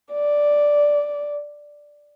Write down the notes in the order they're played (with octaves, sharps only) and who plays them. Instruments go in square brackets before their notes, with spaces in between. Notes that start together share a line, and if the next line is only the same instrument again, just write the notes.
[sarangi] D5